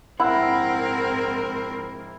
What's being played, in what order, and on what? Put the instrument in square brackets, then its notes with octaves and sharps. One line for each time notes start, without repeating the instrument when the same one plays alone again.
[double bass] A#1 G#2 [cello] C4 A#4 [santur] E4 [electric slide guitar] F#5